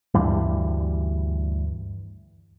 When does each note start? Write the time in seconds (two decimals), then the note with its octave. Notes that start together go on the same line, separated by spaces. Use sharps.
0.14 D2 G2 E3 G3